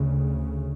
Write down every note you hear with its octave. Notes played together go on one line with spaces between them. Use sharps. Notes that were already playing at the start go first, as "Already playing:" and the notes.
Already playing: D2 C#3